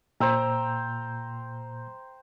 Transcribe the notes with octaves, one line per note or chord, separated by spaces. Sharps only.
A#2 C5 G5 A#5 E6